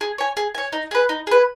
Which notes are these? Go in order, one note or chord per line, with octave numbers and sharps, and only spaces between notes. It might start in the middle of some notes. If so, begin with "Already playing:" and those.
G#4
C#5 G#5
G#4
C#5 G#5
D#4
G#4 B4
D#4
G#4 B4